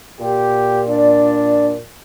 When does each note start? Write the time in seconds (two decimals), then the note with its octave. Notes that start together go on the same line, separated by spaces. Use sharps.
0.20 A#2 G4
0.88 D4 D5